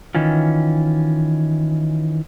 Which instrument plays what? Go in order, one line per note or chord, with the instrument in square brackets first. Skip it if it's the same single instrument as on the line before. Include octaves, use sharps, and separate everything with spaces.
[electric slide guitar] D#3 E3 C#4 F4